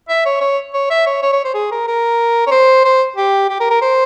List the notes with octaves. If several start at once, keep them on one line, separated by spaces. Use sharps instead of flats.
E5
C#5
C#5
C#5
E5
C#5
C#5
C#5
C5
G#4
A#4
A#4
C#5
C5
C5
G4
G4
A#4
A#4
C5